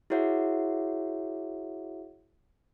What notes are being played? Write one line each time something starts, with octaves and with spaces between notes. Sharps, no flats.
E4 F#4 G#4 C#5 E5 F#5